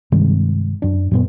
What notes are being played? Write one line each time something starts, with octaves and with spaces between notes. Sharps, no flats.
G2 C3 D#3 G#3
F#2 D4
F#2 A#2 B3